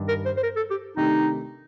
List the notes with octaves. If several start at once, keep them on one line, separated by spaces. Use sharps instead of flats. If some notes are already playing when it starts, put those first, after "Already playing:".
Already playing: G2 D#3 G3 D4
A#4
C5
C5
A#4
A4
G4
C3 D#3 A3 D4 D#4 G4